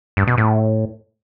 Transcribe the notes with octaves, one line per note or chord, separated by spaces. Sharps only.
G2
B2
A2